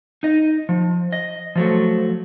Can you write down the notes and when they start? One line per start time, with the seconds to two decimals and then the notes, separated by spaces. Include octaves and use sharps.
0.23 D#4 D#5
0.69 F3
1.13 D#5
1.55 F3 F#3 A3